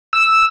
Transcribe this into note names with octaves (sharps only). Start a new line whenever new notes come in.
E6